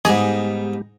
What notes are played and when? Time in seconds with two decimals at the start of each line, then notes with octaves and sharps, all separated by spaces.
0.05 G#2 G3 G#3 B3 D#4 G4 G#4 D#5